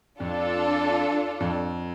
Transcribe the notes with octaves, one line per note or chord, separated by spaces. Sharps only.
F2 D4 F4 A4
F2